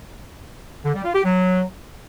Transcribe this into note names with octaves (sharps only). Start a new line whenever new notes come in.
D3
G3
F4
G4
F#3